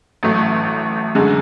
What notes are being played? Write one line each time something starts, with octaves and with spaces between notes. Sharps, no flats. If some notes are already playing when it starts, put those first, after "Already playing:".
A1 A2 F#3 A3
F#2 D3 G#3